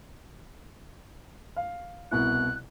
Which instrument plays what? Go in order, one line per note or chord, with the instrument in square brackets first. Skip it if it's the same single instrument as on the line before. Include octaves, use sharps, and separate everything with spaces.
[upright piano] F5
[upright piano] C2 B2 E4 [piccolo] F#6